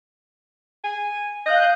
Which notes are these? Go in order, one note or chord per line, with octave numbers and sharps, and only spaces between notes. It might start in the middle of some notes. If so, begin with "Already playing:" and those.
G#5
D#5 F5 F#6 G6